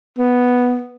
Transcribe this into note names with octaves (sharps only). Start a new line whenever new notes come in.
B3